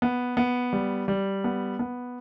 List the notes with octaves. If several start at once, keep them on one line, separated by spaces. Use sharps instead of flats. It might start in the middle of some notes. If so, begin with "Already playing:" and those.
B3
B3
G3
G3
B3
B3